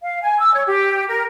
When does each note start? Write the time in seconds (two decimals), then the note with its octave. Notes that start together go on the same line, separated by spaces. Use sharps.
0.03 F5
0.22 G#5
0.40 E6
0.54 C#5
0.66 G4
1.08 A#4